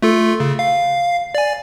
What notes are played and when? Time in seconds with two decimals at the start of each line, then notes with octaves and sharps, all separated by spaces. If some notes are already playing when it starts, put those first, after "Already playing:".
0.02 A3 F4 A4
0.40 C#3
0.59 F5
1.35 D5 G#5